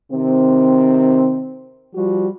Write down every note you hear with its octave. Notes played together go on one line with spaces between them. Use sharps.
C3 D#3 C4
F3 G3 F#4